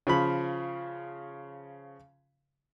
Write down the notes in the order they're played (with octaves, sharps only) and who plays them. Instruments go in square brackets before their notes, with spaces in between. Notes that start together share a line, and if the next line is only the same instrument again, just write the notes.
[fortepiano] C#3 F3 B5